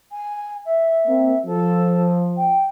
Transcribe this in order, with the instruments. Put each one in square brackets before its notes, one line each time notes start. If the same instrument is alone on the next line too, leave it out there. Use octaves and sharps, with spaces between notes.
[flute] G#5
E5
[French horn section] A#3 C4
[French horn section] F3 [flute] A4
[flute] G5